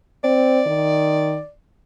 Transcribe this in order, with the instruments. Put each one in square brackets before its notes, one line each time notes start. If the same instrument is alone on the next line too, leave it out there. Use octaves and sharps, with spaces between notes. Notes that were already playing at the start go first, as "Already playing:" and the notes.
[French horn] C4 [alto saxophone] D5
[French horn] D#3